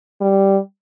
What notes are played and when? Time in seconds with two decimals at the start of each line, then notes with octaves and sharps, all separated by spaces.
0.21 G3